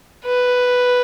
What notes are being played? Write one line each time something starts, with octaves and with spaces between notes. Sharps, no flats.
B4